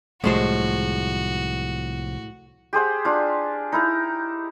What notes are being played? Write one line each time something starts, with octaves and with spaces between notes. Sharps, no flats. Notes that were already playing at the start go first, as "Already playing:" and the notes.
C2 A2 F3 G3 G#3 F#4 C5
G4 G#4 C5 F#5
D4 F4
D#4 E4 A#4